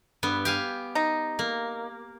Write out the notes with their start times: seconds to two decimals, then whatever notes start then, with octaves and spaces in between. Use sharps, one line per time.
0.23 G2 B3
0.45 G4 F5 G#5
0.95 D#4
1.39 A#3